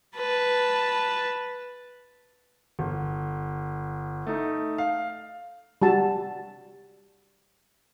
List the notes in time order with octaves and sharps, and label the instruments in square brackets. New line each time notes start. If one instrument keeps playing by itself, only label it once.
[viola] B4 A5
[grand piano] G1
A3 D#4
F5
[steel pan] G3 F#4 A5